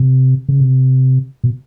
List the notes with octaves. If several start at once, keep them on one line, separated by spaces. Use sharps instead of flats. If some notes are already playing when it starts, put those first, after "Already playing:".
Already playing: C3
C#3
C3
B2